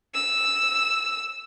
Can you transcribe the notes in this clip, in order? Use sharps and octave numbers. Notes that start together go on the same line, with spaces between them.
E6